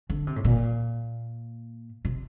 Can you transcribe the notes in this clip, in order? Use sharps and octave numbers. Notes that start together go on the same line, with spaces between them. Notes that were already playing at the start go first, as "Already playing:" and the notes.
D3
C3
A2
A#2
C3